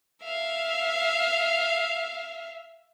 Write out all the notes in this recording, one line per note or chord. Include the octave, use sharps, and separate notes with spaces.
E5 F5